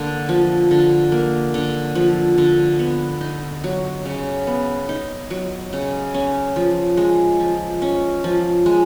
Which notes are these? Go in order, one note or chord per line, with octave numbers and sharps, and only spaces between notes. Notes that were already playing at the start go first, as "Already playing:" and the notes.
Already playing: D3 A#3
F3
D3
A#3
D3
F3
D3
B3
D#4
F#3
C#3
B3
D#4
F#3
C#3
C#4
F3
G#3
F3
C#4
F3
G#3